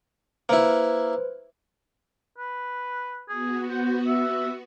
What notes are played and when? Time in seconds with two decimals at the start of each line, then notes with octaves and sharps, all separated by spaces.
0.49 A#3 E4 B4 C5
2.38 B4
3.29 B3 F#4 G#4
3.71 C5
4.07 E5